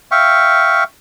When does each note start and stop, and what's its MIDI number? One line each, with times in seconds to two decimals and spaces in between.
0.11 0.84 76
0.11 0.84 77
0.11 0.84 79
0.11 0.84 85